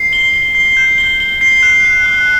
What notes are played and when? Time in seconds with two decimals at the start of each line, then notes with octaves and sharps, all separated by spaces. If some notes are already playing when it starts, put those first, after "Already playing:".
Already playing: C7
0.13 G7
0.34 G7
0.55 C7
0.77 G6
0.98 G7
1.20 G7
1.41 C7
1.63 F#6
1.85 F#6
2.06 F#6